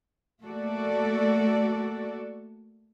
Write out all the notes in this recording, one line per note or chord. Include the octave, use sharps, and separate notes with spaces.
A3 A#3 F#4 A4 D5